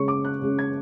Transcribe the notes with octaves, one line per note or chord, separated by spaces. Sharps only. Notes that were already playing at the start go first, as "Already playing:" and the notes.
Already playing: C#3 G#3 C#4 C#6
D6
F#6
C#3 G#3 C#4
G#6